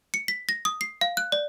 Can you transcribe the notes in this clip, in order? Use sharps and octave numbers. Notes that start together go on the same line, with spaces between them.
C#7
B6
A#6
D#6
C7
F5
F#6
D5